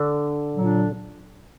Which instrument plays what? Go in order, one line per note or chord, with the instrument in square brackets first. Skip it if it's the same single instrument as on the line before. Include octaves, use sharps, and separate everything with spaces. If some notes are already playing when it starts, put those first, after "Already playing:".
Already playing: [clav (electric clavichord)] D3
[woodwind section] A#2 F#3 D4